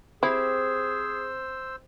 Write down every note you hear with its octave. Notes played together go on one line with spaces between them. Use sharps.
C4 E4 G4 G#4 C5 E6